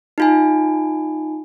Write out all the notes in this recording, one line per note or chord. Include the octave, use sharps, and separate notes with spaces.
D#4 F4 G#5